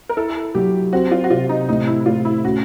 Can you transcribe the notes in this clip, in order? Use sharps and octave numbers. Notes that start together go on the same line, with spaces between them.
A#4
E4 A4
F#3 G4
C4 F#4
F4
F#4
C3 F4
D#4
A2 D#4
E4
A2 F4
E4
C#4 F#4